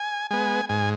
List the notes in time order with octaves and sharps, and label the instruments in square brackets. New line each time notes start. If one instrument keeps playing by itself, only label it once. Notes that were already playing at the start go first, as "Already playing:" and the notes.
Already playing: [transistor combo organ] G#5
G#3 B3 G#5
G#2 G#5